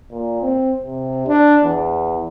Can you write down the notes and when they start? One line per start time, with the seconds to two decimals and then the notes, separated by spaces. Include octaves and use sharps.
0.12 A#2
0.42 C4
0.84 C3
1.27 D4
1.64 E2